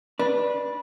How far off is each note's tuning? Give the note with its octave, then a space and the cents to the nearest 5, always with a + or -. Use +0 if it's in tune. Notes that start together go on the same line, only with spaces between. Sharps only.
D4 +0 B4 -20